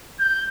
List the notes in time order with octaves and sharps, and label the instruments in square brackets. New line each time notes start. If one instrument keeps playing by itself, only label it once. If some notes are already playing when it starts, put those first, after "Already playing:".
[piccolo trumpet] G6